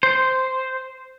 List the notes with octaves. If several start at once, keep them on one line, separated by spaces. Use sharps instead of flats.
C5